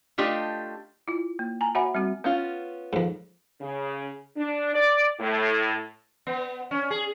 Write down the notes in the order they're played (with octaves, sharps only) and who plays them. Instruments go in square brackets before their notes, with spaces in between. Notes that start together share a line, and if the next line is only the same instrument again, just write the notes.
[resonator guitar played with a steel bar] A3 D4 F4 G4 D#5
[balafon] E4 F4
A#3
G#5 A#5
F#4 C#5 E5 F#5 G#5 B5
G3 C4 F#4
[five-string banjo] B3 C#4 F4
[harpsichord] F2 G#2
[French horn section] C#3
D4
D5
A2
[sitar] B3
C#4
G#4